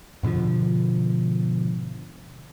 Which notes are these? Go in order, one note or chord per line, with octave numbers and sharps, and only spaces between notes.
G#2 B2 D3 F3